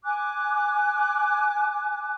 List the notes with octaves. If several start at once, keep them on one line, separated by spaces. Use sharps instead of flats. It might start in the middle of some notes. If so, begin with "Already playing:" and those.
G#5 D6 F#6